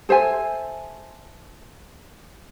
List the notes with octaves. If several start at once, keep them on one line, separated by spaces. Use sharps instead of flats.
A4 C5 E5 G#5